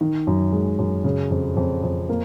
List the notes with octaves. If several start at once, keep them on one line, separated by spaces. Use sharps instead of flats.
D#3
F#2
G#3
F#2
C#3
F2
F2
F2
A#3